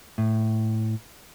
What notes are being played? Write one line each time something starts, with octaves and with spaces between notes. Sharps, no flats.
A2